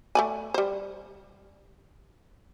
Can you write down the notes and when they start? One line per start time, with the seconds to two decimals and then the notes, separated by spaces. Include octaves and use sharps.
0.15 A3 D5 G#5
0.54 G3 C5